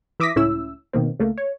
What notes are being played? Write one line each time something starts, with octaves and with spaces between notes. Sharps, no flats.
E3 E5 D6 D#6 A#6 B6
C#2 A2 C#4 E4 E6
B2 D#3 A#3 C4
C#2 A3 A#3
C#5